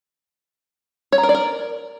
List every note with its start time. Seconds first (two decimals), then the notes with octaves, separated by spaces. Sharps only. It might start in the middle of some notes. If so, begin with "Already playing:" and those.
1.12 C#5
1.18 A#5
1.23 A#4
1.29 D5
1.34 A#4